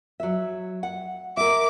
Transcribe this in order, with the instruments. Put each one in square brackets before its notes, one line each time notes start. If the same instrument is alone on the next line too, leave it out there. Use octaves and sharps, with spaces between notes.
[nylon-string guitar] F#3 E5
F#5
[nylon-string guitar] A#4 E5 [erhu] D6